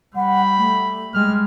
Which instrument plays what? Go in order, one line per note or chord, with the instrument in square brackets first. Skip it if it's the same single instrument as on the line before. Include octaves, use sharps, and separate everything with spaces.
[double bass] G3 [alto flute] F#5 [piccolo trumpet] B5
[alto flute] A3
[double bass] G3 G#3 [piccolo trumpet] F6